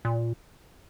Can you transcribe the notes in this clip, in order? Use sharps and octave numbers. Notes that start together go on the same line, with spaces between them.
A#2